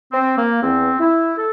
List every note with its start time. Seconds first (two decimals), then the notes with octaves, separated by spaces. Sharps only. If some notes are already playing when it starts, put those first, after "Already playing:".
0.11 C4
0.37 A#3
0.62 E2 E3 C4
0.99 E4
1.37 A4